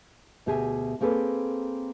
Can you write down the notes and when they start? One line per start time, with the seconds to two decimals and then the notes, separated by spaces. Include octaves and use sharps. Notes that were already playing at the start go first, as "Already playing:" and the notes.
0.46 D2 B2 G4 G#4 E5 G#5
1.01 A#3 C4 G#4 A4 B4